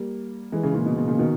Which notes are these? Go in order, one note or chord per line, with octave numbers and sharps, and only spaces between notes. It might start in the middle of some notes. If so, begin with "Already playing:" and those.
Already playing: G3 A#3
E3 G#3
C#3 E3
A#2 C#3
B2
A#2
A#2 C#3
B2 D#3